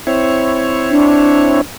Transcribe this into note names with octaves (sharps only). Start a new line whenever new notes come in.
C4 E4 C#5
D4